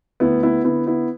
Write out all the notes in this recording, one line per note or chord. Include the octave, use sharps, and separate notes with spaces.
D2 B3 E4
B3 E4
D3 B3 E4
B3 E4